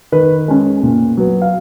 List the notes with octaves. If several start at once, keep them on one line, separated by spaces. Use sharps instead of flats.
D#3 B4
G#3 C#4
A#2
F#3 B3
F5